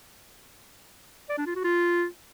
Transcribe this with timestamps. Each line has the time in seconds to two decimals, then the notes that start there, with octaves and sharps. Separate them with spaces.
1.29 D5
1.38 D4
1.47 F4
1.55 F#4
1.64 F4